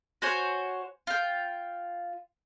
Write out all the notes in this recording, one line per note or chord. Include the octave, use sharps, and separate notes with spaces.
F#4 C5 C#5 G#5
F4 G5